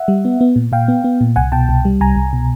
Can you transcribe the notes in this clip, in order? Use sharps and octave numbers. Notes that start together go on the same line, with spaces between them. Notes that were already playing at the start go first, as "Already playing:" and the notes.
Already playing: E5 F#5
G3
B3
B3
A#2
A#2 F5 G5
B3
B3
A#2
C2 F#5 G#5
B2 G5 A5
C2
G3
C2 G#5 A#5
C2
B2